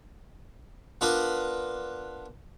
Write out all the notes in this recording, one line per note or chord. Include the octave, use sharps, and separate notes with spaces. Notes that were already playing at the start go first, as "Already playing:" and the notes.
B3 D4 F4 A#4 B4